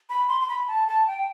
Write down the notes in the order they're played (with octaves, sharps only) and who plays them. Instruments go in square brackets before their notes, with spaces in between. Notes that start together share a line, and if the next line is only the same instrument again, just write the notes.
[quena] B5
C6
C6
B5
A5
A5
G5